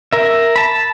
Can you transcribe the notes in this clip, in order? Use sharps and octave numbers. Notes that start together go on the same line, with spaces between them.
A#4 E5
A5 B5